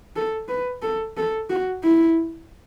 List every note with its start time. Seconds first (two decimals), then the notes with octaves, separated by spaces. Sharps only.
0.16 A4
0.48 B4
0.82 A4
1.17 A4
1.50 F#4
1.83 E4